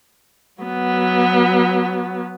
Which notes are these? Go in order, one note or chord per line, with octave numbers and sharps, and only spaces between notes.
F#3 B3